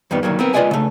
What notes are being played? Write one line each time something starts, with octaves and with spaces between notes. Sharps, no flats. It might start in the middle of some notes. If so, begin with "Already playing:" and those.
F2 D#3 G3 B3
D2 D#3 F#3 A#3
B3 C4 A#4
G#3 F4 B4 D5 D#5 G#5
C#3 A3